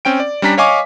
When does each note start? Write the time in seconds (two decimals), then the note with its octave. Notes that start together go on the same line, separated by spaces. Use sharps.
0.05 C4 C#4 G5 D7
0.20 D5
0.42 G3 C#4 D4 A#5 B6
0.58 C#5 D#5 F5 G#5 C#6 D6